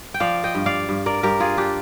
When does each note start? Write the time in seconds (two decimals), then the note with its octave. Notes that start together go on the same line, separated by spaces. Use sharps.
0.14 G5
0.20 F3 D5 F5
0.44 D#5 G5
0.55 G2
0.66 D5 F5
0.89 G2
1.06 A#4 D5
1.23 G2 G4 A#4
1.40 F4 G#4
1.58 D4 G4